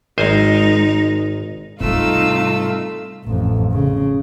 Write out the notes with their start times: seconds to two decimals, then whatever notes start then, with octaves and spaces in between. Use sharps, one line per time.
0.18 G#1 G#3 D#4 C5 G#5
1.80 G#2 C3 G3 A3 C4 D#4 F4 E6
3.24 A1 F2
3.73 C#3